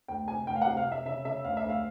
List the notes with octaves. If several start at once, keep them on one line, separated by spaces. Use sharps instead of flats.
D2 G5
C3 G#5
D2 G5
F5
F#5
C3
F5
C3
E5
C#3 E5
C#3 E5
D2 F5
E5
D2
F5